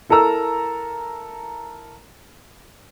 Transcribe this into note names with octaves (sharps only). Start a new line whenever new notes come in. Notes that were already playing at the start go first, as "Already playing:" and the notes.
E4 A4 A#4 A#5 E6